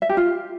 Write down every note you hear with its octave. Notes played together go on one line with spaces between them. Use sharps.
E5
G4
F4